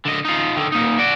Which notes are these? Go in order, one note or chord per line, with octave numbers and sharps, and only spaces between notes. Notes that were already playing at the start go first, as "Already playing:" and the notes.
D3 D#5
D#4 F4
D3 D#3
A#2 D#4
F#4 D5